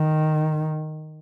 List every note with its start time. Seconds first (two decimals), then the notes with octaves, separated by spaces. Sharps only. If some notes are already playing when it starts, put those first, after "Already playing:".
Already playing: D#3